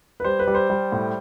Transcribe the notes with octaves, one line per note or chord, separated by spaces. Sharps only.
B4
G3 C5
B4
G3
C5
G3
A2